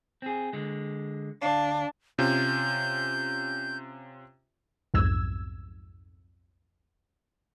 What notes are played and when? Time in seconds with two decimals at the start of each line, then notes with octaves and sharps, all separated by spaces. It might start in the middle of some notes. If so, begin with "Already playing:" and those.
0.22 C4 G#4
0.53 D3 G#3
1.42 D2 D4 F5
2.18 C3 C#4 F4 G6
4.94 B1 F2 G#2 E6 G#6